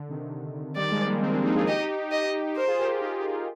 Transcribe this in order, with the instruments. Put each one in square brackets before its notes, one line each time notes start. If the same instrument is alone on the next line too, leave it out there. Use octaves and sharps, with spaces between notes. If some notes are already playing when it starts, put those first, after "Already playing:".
Already playing: [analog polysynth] D3
C3 D#3
[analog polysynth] D#3 G3 [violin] D5
[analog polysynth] F3 G#3
G3 A#3
G#3 C4
A#3 D4
C4 D#4
F4 G#4
[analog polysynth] D#4 G4 [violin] D#5
[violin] D#5
[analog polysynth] G4 A#4 [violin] C5
[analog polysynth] F4 G#4
G4 A#4
D#4 G4
G#4
G4